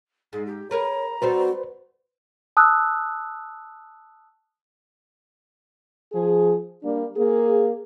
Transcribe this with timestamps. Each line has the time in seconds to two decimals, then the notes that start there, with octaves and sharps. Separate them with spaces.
0.33 G#2 G#4
0.46 G4
0.71 G#4 A#4 B4 C#5 A#5
1.22 G3 C4 F#4 A4 B4 C5
2.57 A5 D#6 E6 F#6
6.13 F3 G#4
6.83 G3 A#3 D4
7.17 A#3 G#4